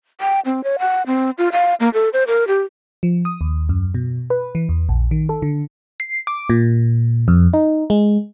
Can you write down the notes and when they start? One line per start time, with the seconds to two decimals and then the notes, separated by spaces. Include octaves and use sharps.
0.21 G5
0.45 C4
0.64 C#5
0.79 F#5
1.06 C4
1.38 F4
1.52 F5
1.80 A#3
1.94 A4
2.13 C5
2.27 A#4
2.48 G4
3.03 F3
3.25 D#6
3.41 D#2
3.69 F#2
3.94 B2
4.30 B4
4.55 E3
4.69 E2
4.89 A#1
5.11 D#3
5.29 A4
5.42 D3
6.00 C7
6.27 D6
6.50 A#2
7.28 F2
7.54 D#4
7.90 G#3